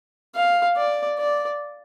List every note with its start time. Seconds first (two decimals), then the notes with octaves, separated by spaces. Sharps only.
0.35 F5
0.77 D5
1.18 D5